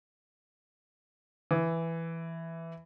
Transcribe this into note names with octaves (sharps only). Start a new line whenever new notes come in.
E3